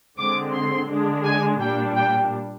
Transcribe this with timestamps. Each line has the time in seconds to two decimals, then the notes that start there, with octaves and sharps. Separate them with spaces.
0.18 D3 G#3 C4 D6
0.54 C6
0.90 D3 G#3 D4
1.25 G#5
1.60 A#2 G3 D4 G5
1.96 G5